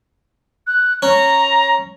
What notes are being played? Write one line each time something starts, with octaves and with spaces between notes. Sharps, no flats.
F#6
C#4 A#5